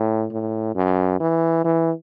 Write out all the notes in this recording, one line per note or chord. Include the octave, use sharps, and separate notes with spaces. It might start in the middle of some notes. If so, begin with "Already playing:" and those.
Already playing: A2
A2
F#2
E3
E3